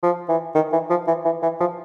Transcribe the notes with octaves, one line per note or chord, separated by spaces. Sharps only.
F3
E3
D#3
E3
F3
E3
E3
E3
F3